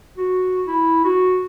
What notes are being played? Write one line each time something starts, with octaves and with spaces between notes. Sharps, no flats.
F#4
E4
F#4